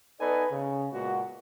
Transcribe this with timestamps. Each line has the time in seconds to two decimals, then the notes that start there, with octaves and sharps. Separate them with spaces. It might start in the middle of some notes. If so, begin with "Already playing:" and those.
0.20 B3 D#4 A4 B4 D5 G#5
0.52 C#3
0.93 A#2 G#3 B3 F#4